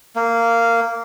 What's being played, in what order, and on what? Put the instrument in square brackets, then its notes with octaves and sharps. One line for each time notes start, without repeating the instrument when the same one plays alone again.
[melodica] A#3